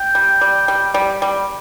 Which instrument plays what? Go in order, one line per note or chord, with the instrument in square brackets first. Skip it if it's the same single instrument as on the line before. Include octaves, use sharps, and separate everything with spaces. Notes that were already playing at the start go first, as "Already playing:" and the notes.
Already playing: [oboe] G5
[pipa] G3
G3
G3
G3
G3